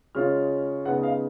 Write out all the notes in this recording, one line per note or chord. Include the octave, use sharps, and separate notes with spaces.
C#3 G#3 C#4 F4 F6
C#3 G#3 B3 D#4 F#5
D#5
F5